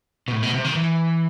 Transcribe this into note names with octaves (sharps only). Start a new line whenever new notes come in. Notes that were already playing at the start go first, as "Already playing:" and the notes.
B2
A2
B2
C3
D#3
E3